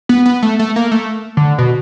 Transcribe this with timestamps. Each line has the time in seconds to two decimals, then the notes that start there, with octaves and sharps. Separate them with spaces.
0.09 B3
0.25 B3
0.42 A3
0.59 A3
0.76 A#3
0.91 A3
1.37 D3
1.58 B2